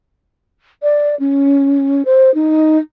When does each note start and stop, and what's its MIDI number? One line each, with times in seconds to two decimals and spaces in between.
0.83 1.15 74
1.19 2.02 61
2.05 2.33 72
2.34 2.78 63